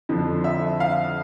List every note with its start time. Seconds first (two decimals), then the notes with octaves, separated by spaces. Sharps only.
0.09 F2 D3 F3
0.44 E5
0.80 F5